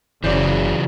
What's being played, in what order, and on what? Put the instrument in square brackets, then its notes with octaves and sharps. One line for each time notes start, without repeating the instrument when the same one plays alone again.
[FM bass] F#1 [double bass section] C#3 [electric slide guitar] E3 F#3 [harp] C5 D5